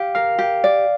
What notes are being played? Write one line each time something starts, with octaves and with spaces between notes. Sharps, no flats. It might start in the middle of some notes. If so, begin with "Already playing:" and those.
Already playing: G4 F5
A#4 F5
G4
D5